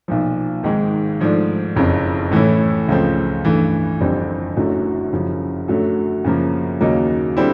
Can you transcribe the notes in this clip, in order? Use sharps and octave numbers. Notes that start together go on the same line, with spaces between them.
B1 A#2 F3
G#1 G#2 D#3 G#3
G#2 F3 A3 D4
F#1 F2 C#3
A2 E3 A3 C#4 E4
C#2 C#3 F3 A3 C4
G2 E3 A3
F#1 F2 D3 G3 C4
F#1 F#2 D3 F#3 A3
F#1 F#2 C#3 F3
F#2 D3 F#3 A3
F#2 C#3 F3 A#3
D#2 C#3 F#3 A#3 D#4
D3 G3 C4 E4